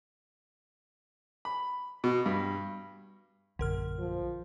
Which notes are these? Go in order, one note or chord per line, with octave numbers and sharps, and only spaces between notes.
B5
B2
G2
A#1 F#2 D3 A#4 F6
F3